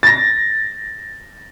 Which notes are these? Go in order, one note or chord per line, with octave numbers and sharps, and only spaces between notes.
A6 A#6